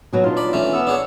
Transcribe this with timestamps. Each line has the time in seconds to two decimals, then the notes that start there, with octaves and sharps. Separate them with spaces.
0.13 B2 F#3 D#4
0.24 D4 D#4 F4
0.37 D5 B5
0.53 E3 A3 C#4
0.73 B3 E6
0.87 D4 G#4 C#5